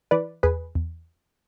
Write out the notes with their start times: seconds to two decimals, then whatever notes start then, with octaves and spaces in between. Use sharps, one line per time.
0.11 E3 B4 D5
0.43 E2 G#4 B4
0.75 E2